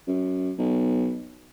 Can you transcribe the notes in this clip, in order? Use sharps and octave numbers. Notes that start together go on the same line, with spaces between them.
F#2
B1